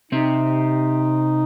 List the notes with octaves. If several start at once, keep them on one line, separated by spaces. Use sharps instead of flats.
C3 C4 D#4